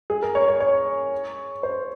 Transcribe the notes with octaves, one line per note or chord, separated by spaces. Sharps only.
G#4
A#4
C#5
C#5
C#5
C5